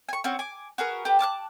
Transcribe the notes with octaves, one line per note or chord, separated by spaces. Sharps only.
G#5 C#6
C4 C#4 F#4
G#5 D6
F#4 G#4 A#4 B4
G4 A4 B4
A5 D6 F6 F#6